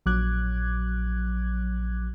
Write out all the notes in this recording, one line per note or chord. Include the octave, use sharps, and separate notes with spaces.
A#1 F#3 D6 F#6 G#6